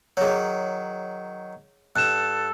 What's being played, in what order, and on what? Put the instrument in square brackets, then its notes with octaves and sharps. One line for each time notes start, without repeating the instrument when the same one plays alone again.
[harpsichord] D#3 F#3 [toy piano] G#4 C#5
[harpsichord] G2 [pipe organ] A4 [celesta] F#6 E7